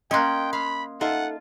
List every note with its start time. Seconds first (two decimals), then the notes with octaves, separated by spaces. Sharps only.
0.11 A#3 C#4 D#5 G5 C6 F#6
0.53 F5 B5
1.01 D#4 F4 A4 E5 F#5